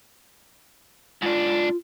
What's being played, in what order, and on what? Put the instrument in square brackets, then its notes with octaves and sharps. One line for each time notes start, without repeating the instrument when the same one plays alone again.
[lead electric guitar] G#2 D4 [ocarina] F4